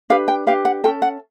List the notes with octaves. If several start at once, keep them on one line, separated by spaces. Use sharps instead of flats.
D4 G4 B4 F5
G5
D4 G4 B4 F5
F#5
C#4 F4 A4 G5
F#5